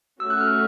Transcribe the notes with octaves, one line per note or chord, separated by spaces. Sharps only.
A3 C#4 F#4 E6
F#6
F6